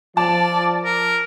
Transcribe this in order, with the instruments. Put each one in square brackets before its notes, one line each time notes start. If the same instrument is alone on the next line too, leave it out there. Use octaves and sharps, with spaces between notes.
[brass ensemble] F3 [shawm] D5 [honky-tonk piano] A5
[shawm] A#4